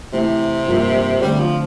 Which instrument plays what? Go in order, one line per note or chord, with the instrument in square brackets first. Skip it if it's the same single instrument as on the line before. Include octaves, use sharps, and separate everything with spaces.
[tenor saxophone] C3 [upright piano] E3 A3 E4
[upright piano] G2 F3 A#3 F4
[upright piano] D3 A3 C4 [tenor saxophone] G3
[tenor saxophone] F3